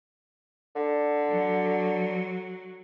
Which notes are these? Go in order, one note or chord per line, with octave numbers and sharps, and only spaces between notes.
D3
F#3